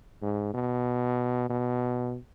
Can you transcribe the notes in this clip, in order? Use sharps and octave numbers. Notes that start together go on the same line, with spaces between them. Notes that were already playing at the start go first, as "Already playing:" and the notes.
G#2
B2
B2